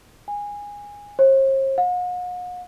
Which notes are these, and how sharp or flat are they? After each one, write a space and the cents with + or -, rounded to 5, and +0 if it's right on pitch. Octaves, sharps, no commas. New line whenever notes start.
G#5 -20
C5 +45
F#5 -45